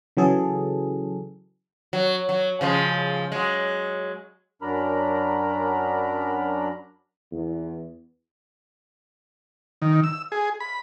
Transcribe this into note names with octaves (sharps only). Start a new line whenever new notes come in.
C#3 E3 F#3 G#4 A4
F#3
F#3
C#3 F3 G#3
F#3 G#3
F#2 F#3 D4 A#4 A#5 B5
E2
D#3
E6
G#4
B5